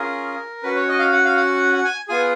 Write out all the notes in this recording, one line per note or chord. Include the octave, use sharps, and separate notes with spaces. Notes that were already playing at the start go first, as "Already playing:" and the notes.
Already playing: C#4 F4 G#4 A#4
C#4 F#4 B4
C#5
D#5
F5
F#5
F5
F#5
F#5
G#5
B3 F4 G#4 G#5